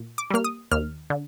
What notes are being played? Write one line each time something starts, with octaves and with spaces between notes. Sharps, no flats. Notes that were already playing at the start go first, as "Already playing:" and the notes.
Already playing: A#2
D6
G3 A#3 F6
D#6
D#2 F6
D3